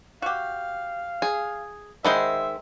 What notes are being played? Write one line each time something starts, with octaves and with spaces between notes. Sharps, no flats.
F#4 G4 F5
G#4
D#3 G#3 C5 D#5 E5 F#5 B5